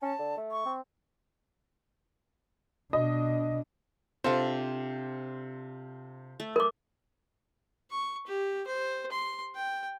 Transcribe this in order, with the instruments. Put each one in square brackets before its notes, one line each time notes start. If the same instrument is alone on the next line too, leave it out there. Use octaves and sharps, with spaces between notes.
[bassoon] C#4 [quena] A5
[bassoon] D3
A3
[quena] C#6
[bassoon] C4
[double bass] B2 D4 [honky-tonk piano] D#5
[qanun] C3 D4 [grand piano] F4 A4 C5
[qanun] A3
[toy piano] A#4 D6
[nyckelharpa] C#6
G4
C5
C6
G5